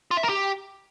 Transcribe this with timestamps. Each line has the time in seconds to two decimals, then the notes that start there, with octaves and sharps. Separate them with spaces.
0.11 F4
0.17 E5
0.23 A#4
0.29 G4